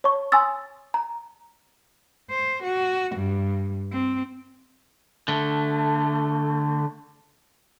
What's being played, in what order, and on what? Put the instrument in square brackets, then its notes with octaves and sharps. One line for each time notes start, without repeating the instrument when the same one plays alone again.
[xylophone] C#5 A5 C#6
G#5 C6 D#6 E6 A6
A#5
[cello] C5
F#4
G2
C4
[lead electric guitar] D3 A3